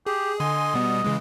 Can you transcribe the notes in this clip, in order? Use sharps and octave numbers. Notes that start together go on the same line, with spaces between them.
G4 G#4
D3 D#5 G#5 C6
B2 G3 B3
C#3 E3 G#3